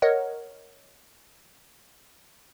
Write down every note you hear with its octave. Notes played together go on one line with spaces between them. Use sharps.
A#4 C#5 D#5 F#5